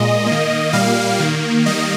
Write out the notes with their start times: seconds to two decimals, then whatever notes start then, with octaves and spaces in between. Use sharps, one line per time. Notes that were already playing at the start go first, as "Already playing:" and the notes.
Already playing: A#2 G#3 D#5
0.26 D#3 A#3
0.73 A#2 G3 A#3 F5
1.20 D#3 A#3
1.66 D#3 G3 A#3 D#5